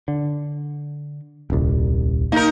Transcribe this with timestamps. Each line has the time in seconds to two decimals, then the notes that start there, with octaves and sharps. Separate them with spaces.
0.08 D3
1.50 D#1 C2
2.32 A#3 D#4 A#4